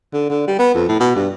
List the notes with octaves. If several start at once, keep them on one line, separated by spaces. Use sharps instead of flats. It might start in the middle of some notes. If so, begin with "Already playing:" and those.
D3
D3
G3
B3
F2
A2
B2
G2